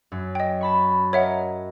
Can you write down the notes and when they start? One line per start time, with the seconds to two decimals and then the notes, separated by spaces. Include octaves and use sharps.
0.12 F#2
0.35 D#5 G5
0.61 A5 B5 C#6
1.13 A#4 C#5 D#5 E5 F#5